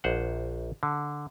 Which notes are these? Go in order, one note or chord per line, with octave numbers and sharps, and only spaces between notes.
A#1 C5 F#5
D3